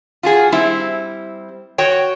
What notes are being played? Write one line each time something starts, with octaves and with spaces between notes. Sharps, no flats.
F4 F#4 G#4
G3 C4 E4
F#4 C#5 G5